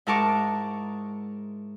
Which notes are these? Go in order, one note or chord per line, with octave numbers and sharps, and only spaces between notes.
G#2 E4 A#4 A5 C#6 D6